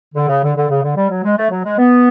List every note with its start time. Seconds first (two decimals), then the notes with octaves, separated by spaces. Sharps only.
0.15 D3
0.28 C#3
0.43 D3
0.56 D3
0.69 C#3
0.83 D3
0.96 G3
1.10 F#3
1.24 G#3
1.37 A3
1.50 F#3
1.64 G#3
1.78 B3